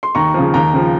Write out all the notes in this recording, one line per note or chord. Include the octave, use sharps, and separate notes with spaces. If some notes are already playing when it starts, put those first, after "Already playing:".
C6
D#2 A#5 C#6
C#3 F3
D#2 G5 A#5
C#3 F3